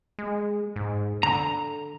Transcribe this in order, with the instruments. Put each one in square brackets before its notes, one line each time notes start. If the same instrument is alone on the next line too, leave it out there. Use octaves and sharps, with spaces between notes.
[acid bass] G#3
G#2
[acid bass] D3 [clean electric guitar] A#5